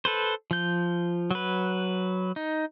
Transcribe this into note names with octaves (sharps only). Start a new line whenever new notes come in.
A4 B4 C5
F3 G6
F#3 B4
D#4